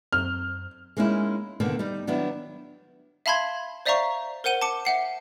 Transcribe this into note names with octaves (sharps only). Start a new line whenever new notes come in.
F#2 C4 F6
G#3 A#3 C#4 D#4 E4
B2 D3 D#3 A#3
G3 D#4
D#3 F#3 B3 D4 E4
E5 F5 A5 B5 C6 G#6
C5 D5 E5 F5 A#5 C#6
A#4 C5 F#5 D#7 G7
A5 D6 C#7
E5 F#5 C7